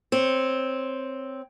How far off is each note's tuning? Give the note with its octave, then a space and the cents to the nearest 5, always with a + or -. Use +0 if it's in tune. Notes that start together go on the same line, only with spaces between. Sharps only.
C4 +0 C#5 +0